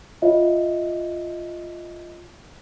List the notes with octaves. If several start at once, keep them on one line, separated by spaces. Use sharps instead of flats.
F4 C#5 D#5 E5